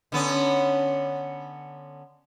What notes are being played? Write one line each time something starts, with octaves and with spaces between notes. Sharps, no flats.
D3 B3 C#4